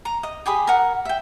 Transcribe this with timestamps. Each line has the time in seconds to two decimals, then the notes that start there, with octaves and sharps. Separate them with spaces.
0.05 A#5
0.23 D#5
0.46 G4 G#4 B5 D#6
0.67 A#4 F#5
1.05 E5 G5